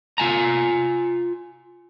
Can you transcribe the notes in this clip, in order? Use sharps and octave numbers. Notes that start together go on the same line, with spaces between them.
F4 G#5 A#5